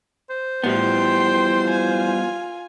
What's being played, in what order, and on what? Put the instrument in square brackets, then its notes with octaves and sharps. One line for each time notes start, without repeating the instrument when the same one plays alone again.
[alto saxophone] C5
[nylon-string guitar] A2 E3 [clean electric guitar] F3 G3 B3 [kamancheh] G5 C6
[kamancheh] F4 G#5